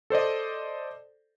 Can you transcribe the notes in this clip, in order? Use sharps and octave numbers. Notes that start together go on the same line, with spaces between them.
A4 C5 D5 D#5